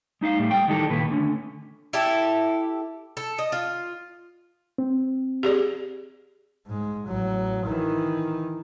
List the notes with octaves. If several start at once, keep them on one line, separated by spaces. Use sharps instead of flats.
G#3 D#4 E5 F5
A2 G3 A3
G#3 G5
D#3 E3 G3 D#4 G4 A4
C#2 A#2 D#3 B4 B5
D3 A3 C#4
E4 G4 A4 E5
A4
D#5
F4
C4
G4 G#4 D5
G#2 G#3
A1 F#3
D#3 E3